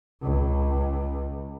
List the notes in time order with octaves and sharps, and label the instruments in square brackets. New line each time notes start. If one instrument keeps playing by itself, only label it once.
[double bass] C#2